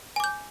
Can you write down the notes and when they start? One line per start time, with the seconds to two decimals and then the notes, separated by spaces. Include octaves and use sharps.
0.16 G#5
0.20 D6
0.24 G6